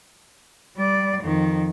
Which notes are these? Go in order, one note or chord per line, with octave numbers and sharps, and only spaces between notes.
G3 D5
F2 D#3